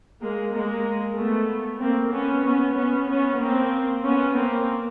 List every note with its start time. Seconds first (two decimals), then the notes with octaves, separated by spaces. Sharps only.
0.22 G#3 A#3
0.53 G#3 A#3
1.17 A3 B3
1.81 A#3 C4
2.12 B3 C#4
2.45 B3 C#4
2.76 B3 C#4
3.08 B3 C#4
3.40 A#3 C4
4.04 B3 C#4
4.35 A#3 C4